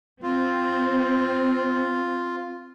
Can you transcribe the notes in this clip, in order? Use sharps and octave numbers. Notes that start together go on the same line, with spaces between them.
C4 F4